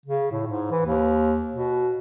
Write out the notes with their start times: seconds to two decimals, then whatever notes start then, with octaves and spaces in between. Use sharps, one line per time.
0.06 C#3
0.31 A2
0.47 G#2
0.71 E3
0.86 D#2
1.54 B2